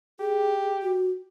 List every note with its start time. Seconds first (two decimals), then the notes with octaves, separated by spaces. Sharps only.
0.20 G4 G#4
0.82 F#4